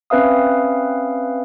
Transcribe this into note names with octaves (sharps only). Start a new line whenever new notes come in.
C4 C#4 B4 E5 F5 D#6